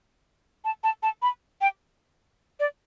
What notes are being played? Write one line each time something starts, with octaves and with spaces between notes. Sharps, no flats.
A5
A5
A5
B5
G5
D5